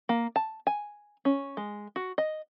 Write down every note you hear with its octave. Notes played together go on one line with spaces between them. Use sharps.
A#3
A5
G#5
C#4
G#3
F#4
D#5